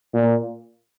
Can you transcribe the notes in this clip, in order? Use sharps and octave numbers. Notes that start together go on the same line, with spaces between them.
A#2